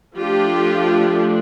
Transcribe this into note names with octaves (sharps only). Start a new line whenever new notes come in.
F3 A3 D4 F4 G4